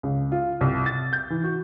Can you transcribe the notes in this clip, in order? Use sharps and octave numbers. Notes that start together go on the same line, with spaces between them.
C#2
F4
C2
A6
G6
E3
F#4